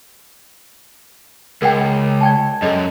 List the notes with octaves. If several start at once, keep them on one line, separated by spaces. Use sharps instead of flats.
C#2 A#4 F#5 G5
D5 G5 A5
F#2 A4 D#5